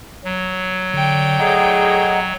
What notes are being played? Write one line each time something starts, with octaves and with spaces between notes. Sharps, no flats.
F#3
D3 D5 G5
A2 G#4 D#5 F#5 A#5